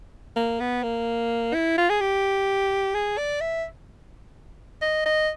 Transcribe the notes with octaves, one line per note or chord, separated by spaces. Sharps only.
A#3
B3
A#3
E4
F4
G#4
G4
G#4
D5
E5
D#5
D#5